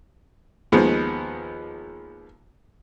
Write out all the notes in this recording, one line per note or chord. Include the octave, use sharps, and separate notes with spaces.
D#2 F3 G#3 B3